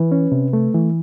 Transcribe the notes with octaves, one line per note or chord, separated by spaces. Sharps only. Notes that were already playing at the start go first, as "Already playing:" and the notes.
Already playing: E3 B4
C#4
C3
A3
E3